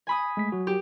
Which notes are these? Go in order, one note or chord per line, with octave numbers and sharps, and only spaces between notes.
G#5 B5 D#6
G#3 A3 B6
F#3 F#4
G4